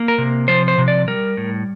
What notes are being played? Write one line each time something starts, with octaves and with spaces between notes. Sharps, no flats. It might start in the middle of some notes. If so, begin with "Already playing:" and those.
Already playing: A#3
A#4
C3
F3 C5
C5
C3
D5
G3 A#4
A2